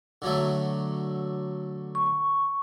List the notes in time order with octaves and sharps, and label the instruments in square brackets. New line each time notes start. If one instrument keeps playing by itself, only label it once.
[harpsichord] D3 F#3 A3
[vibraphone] C#6